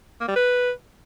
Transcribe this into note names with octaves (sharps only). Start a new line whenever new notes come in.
A#3
G3
B4